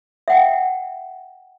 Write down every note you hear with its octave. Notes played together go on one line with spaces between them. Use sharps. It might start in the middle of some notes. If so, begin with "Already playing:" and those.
E5 F#5 G5